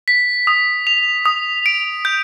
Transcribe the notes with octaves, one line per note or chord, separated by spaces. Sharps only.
B6
D#6
F7
D#6
D7
G6